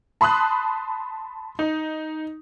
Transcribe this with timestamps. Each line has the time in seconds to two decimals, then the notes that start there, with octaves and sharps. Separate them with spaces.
0.21 A5 B5 C6 D#6 F#6
1.59 D#4